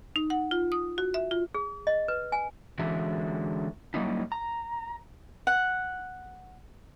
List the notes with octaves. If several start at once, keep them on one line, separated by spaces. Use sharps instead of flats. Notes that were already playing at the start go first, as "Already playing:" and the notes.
D#4
F#5
F4
D#6
F#4
E5
F4
G#4
D#5
B4
G#5
D3 E3 G#3 C#4 F#4 E5
F#3 G3 A#3 C#4 D#4 E4
A#5
F#5